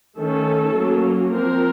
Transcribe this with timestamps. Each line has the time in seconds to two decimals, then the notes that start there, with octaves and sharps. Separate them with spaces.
0.17 D#3 A3 C#4 A4
0.75 F#3 A#3 C#4
1.31 F3 C4 A#4